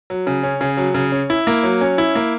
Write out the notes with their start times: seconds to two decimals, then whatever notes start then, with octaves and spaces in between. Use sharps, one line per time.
0.10 F#3
0.27 C#3
0.43 C#4
0.61 C#3
0.77 F#3
0.94 C#3
1.12 C#4
1.30 E4
1.47 A#3
1.63 F#3
1.81 C#4
1.98 E4
2.15 A#3